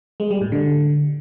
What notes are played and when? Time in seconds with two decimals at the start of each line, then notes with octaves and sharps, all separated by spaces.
0.20 G#3
0.31 G3
0.41 A2
0.52 D3